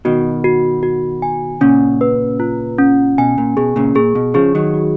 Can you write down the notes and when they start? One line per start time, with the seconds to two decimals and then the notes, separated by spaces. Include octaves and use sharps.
0.05 B2 D#3 F#4
0.44 F#4
0.83 F#4
1.22 G#5
1.61 A#2 C#3 C#4
2.01 B4
2.40 F4
2.78 C#4
3.18 B2 G#5
3.38 A#2
3.57 B2 G#4
3.76 A#2 C#3
3.95 A#2 G#4
4.15 B2
4.34 C#3 F3 G#4
4.55 D#3 F#3
4.74 F#4